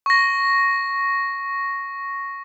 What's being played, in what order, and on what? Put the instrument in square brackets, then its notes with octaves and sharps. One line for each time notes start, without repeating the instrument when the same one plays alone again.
[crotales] C#6 A#6